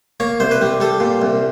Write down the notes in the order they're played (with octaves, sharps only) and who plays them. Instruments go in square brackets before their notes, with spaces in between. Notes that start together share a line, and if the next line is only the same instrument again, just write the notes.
[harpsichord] A#3 C#5
C2 C5
B4
G3
G3 A4
A#2
C2